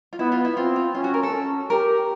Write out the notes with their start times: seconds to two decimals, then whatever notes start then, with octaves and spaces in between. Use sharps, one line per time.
0.13 F4
0.19 B3 E4
0.32 F4
0.45 E4
0.57 C4 F4
0.76 F4
0.94 C#4 F4
1.04 F#4
1.14 A#4
1.23 A4
1.33 C#4
1.70 G4 A#4